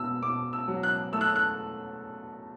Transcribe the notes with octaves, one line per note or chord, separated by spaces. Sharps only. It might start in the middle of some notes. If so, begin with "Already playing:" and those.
Already playing: B2 E6
B2 D6
E6
F#3
F#6
A3 E6
F#6
E6
F#6